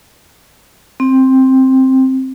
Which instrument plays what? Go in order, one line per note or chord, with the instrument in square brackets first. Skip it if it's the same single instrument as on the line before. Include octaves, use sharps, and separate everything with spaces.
[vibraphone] C4